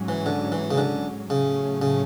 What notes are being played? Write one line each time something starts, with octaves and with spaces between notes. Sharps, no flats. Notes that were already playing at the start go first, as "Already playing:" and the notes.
Already playing: G#2 F#3 C#4
E3
D3
E3
C#3
D3
A2 C#3 F#3 A3 C#4
C#3